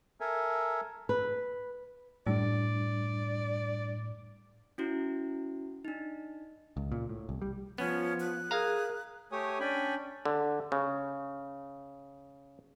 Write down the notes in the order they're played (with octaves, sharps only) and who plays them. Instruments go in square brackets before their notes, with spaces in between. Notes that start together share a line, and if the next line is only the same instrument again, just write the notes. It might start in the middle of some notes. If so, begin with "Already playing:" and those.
[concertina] A4 A#4 E5 G#5
[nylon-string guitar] B4
[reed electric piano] F#2 G3 D4 [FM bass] A2 [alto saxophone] D5
[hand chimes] C#4 E4 F#4
D4 D#4
[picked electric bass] C#2
A#2
A2
C2
G3
[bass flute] F3 [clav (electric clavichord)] B3 [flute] C#4
[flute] F#6
[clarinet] G#4 [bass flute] A#4 [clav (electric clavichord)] F5 A#5
[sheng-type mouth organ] A3 G4 C#5 G#5 D#6
C#4 D4 G5 G#5 B5
[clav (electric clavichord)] D3
C#3